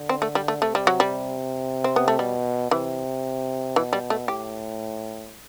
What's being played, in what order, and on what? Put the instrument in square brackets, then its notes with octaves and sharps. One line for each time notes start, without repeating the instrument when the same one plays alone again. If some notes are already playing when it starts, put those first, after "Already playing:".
Already playing: [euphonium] D3
[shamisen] C4
A3
G3
A3
[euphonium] C3 [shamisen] A3
[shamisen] G3
F#3
G3
C4
B3
A3
[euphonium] B2 [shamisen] G3
[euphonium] C3 [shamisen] E3
[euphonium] B2 [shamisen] E3
[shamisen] G3
A3
[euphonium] A2 [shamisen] G4